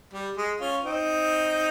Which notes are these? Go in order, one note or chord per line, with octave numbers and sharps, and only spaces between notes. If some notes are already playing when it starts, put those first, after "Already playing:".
G3
G#3
C#4 F4
C4 D#4